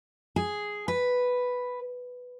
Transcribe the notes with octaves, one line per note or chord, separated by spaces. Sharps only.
G#4
B4